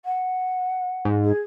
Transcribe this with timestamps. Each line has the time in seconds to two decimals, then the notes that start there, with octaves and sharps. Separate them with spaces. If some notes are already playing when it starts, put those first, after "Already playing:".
0.05 F#5
1.05 G#2
1.23 G#4